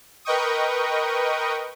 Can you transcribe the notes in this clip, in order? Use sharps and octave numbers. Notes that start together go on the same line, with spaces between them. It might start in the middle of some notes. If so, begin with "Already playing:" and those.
A#4 B4 D#5 G5 C#6 D#6